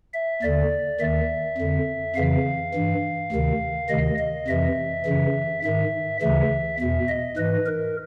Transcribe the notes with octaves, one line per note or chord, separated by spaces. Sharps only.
E5
D#2 D3 D5
D#2 D#3 E5
F2 D3
F2 C#3 E3 F5
G2 E3
D2 C3 D#3
D2 C3 D#3 D#5
D#5
F2 C3 E3 E5
F#2 C#3 E3
G#2 D#3 E5
D2 C#3 E3 E5
E2 B2 E5
D#5
G#2 E3 B4
A#4